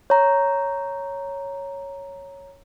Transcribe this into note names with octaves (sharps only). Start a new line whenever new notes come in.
C#5 A#5